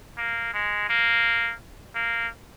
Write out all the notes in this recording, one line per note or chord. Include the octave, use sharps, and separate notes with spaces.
A#3
G#3
A#3
A#3